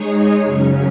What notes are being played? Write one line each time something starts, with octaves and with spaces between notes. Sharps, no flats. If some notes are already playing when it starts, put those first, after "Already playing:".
Already playing: G#3 D#4 G#4 C#5
F#2 C#3 F#3 C#4